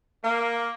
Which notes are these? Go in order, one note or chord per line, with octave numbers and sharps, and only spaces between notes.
A#3